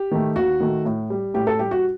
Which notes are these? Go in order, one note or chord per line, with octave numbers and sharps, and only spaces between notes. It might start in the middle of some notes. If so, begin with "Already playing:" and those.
Already playing: G4
D#3 A3
D#2 F#4
D#3 A3
A2
G3
A2 G4
A4
G3 G4
F#4